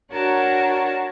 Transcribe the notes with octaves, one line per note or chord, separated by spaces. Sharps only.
D4 F#4 A#4 C#5 F#5 A5